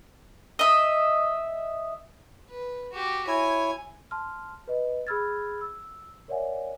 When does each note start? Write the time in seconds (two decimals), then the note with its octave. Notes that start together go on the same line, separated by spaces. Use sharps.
0.59 D#5 E5
2.50 B4
2.93 F#4 G4
3.27 E4 C#5 G#5
4.11 A5 C6 F6
4.68 B4 D#5
5.07 G#4 B5 E6 F6 G#6 A6
5.61 E6
6.28 A#4 C#5 D5 E5 F#5 G#5